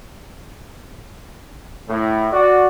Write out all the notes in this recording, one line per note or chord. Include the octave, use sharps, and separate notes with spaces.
A2
F#4 D5